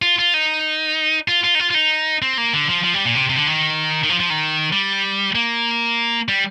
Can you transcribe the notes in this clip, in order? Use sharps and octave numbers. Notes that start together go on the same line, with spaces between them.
F4
F4
D#4
F4
F4
D#4
F4
F4
D#4
C4
A#3
D3
F3
F3
G3
A#2
C3
C3
D3
D#3
D#3
F3
F3
D#3
G3
A#3
G3